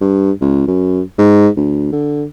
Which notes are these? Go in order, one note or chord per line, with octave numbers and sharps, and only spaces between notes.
G2
C#2
F#2
G#2
D2
D3